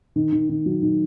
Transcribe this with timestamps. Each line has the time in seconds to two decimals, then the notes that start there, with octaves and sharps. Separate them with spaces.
0.16 D#3
0.32 D#3
0.49 D#3
0.66 F#3
0.82 D#3